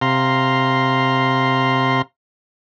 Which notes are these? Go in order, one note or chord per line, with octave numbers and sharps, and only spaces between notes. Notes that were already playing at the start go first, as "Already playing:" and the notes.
C3 F5 A#5 C6